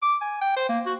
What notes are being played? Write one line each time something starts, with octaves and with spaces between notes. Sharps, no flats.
D6
G#5
G5
C5
A#3
F#4